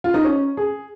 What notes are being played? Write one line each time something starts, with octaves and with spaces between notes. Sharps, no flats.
F4
D#4
C#4
G#4